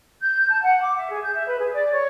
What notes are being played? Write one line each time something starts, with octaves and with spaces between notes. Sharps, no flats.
G6
A5
F#5
D6
E5
G#4
G6
E5
B4
G#4
D5
C#5